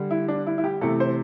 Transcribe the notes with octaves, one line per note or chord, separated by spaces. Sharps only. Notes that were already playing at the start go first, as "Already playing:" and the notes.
Already playing: D3 G3
E4
D4
E4
E4
G4
C3 E3 A3 A4
C5